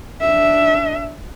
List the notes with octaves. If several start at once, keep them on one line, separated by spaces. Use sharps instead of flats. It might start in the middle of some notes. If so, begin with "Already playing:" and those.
D4 E5